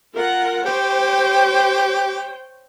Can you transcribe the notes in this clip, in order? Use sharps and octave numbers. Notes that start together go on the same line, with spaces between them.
F4 A#4 F#5
G4 C5 C#5 G5